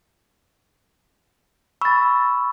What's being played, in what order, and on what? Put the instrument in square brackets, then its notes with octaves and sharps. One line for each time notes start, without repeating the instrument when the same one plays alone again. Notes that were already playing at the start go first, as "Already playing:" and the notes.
[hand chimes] B5 E6 [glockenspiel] C#6 A6